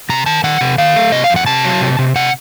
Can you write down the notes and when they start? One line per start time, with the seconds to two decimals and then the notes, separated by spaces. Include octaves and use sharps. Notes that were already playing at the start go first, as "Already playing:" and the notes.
0.09 C3 A#5
0.26 D#3 A5
0.44 D#3 F#5
0.61 C3
0.78 D#3 F5
0.96 A3
1.12 C3 D#5
1.24 F5
1.30 F2
1.36 F#5
1.46 C3 A5
1.65 F#3
1.81 C3
1.99 C3
2.15 C3 F#5